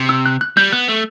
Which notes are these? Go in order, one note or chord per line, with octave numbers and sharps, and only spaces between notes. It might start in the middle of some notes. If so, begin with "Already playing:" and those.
Already playing: C3
E6
F#6
F#6
G3 G6
B3 F#6
A3